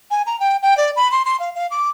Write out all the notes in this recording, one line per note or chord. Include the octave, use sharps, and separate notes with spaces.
G#5
A#5
G5
G5
D5
B5
C6
C6
F5
F5
D6